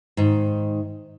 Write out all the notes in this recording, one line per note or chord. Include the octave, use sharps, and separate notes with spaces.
G#2 D#3